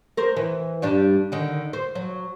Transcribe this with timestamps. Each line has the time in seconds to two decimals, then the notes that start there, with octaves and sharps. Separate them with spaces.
0.17 A#4 C5
0.37 E3
0.82 G2 G3 D4
1.32 D3 D#3
1.73 C5
1.95 F#3